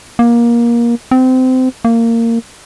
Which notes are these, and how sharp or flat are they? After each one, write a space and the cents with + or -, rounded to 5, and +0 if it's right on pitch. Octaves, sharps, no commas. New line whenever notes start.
A#3 +20
C4 -25
A#3 -20